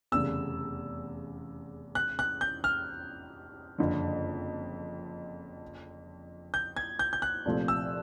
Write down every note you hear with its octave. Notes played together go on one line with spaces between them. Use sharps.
F1 E2 C#3 E6
F#6
F#6
G6
F6
F#1 F2 D3
G6
G#6
G6
G6
F#6
C2 A#2 F3 A3 C4
E6